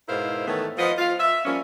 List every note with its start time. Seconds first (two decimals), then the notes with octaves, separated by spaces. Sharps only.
0.08 G#2 B2 E4 A#4 C5 F5
0.47 D#3 E3 A3 B3 A4 C#5
0.78 F3 B3 D#5
0.98 F4 F5
1.20 E5
1.46 F3 G3 A#3 C#4